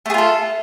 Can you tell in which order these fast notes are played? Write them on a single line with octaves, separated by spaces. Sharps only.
A3 G#4 F4 A4